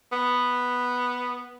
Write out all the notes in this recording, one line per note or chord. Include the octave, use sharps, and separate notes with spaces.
B3